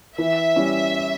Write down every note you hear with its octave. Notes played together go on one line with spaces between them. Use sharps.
E3 E5
G3 C#4 E4